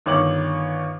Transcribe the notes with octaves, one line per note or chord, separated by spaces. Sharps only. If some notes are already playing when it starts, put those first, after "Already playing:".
G1 D#3 C#5 D6 F#7